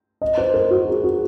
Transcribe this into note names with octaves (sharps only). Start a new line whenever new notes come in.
D#5
C5
A#4
F#4
G#4
F#4